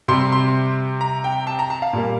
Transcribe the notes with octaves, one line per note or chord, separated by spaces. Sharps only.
C3 G3 C4 C6
C6
A#5
G5
A5
A#5
A5
F5
A#2 G3 A#3